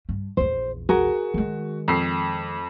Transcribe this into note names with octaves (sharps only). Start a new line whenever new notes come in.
G2
A#1 E2 C5
F#4 G#4 A#4
D#3 G#3
F2 C7